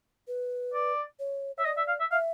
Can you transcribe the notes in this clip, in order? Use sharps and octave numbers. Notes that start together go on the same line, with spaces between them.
B4
D5
C#5
C#5 E5
D5 D#5
E5
F5
E5
E5 F5